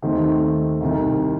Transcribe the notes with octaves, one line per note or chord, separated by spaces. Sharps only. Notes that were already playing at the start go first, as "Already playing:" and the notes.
D#2 D#3 A3 C4
C2 C3 D#3